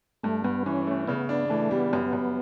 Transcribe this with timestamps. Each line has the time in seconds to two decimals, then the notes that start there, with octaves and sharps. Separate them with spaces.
0.24 G2 A3
0.44 G2 B3
0.66 E3 C#4
0.87 A3
1.08 C#3 B3
1.29 D4
1.50 E3 A3
1.71 G3 B3
1.93 F#2
2.13 F#2